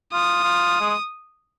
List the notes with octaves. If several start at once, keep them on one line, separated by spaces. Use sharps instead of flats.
F4 D#6
F4
G#3